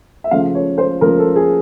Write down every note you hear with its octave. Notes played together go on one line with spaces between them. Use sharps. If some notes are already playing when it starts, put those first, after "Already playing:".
E5
C#3 F3 A3 F5
C#5
C5
C#3 F3 A3 A#4
A4
G#4